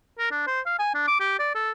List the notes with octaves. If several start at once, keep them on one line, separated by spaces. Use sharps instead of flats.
A#4
D4
C5
F5
G#5
D4
D6
G4
D5
A4